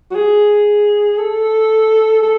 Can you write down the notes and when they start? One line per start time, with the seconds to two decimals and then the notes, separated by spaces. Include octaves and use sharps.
0.11 F#4
0.15 G#4
1.18 A4
2.23 A4